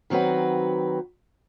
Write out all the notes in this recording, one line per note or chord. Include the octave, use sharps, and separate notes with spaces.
D#3 F#3 C4 F#4 B4